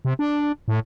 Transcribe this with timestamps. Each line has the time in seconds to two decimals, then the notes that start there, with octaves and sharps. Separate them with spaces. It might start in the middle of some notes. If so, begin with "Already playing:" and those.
0.05 C3
0.19 D4
0.68 A2